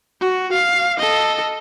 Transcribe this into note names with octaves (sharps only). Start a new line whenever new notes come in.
F#4
F5
A4 D#5